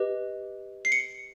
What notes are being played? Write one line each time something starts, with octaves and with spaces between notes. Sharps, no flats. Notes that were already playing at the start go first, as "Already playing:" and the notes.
Already playing: G4 B4 D#5
C7
C#7